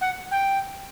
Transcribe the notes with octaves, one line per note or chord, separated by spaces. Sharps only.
F#5
G5